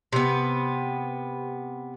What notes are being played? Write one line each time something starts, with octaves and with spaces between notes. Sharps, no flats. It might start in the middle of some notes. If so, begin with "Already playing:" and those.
C3 B3